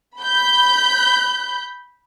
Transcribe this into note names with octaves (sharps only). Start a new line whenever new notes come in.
B5 G6